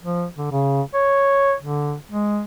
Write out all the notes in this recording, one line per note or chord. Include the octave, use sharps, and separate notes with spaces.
F3
D3
C#3
C#5
D3
G#3